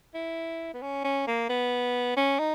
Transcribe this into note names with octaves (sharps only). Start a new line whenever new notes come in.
E4
B3
C#4
C#4
A#3
B3
C#4
D#4